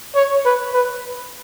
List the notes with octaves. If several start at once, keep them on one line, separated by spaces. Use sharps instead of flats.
C#5
B4
B4